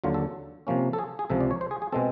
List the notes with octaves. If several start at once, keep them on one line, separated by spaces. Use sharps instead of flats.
D#2 D3 F#3 F4
A4
C3 F3 A#3 C#4
A4
G#4
G#4
C#2 C3 F3 A4
D5
C#5
C5
G#4
G#4
B2 G#3 C4 A4